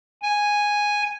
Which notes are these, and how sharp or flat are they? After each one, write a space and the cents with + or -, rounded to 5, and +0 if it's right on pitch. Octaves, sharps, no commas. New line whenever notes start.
G#5 -5